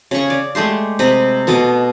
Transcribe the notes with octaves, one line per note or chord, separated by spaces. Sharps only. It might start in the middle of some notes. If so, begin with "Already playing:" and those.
C#3 C#6
D5
G#3 A3 G4 C6
C3 D#5 B5
B2 A4 D#5 D6